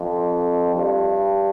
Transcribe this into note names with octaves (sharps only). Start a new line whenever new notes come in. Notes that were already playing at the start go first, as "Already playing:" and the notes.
Already playing: F2
G2